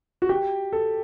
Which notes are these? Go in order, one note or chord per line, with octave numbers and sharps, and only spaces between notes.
F#4
G4
A4